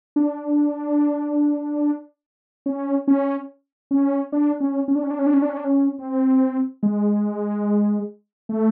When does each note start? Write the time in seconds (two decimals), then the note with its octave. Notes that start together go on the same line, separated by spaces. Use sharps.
0.16 D4
2.66 C#4
3.08 C#4
3.91 C#4
4.32 D4
4.61 C#4
4.88 C#4
4.95 D4
5.03 C#4
5.11 D4
5.19 C#4
5.26 D4
5.34 C#4
5.42 D4
5.49 C#4
5.57 D4
5.65 C#4
5.99 C4
6.83 G#3
8.49 A3